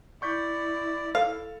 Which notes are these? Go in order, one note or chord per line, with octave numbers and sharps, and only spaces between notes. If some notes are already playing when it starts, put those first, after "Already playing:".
E4 D5 C#6 G6 B6
A4 F5